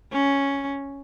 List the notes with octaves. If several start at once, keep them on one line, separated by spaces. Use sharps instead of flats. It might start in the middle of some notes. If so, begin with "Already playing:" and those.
C#4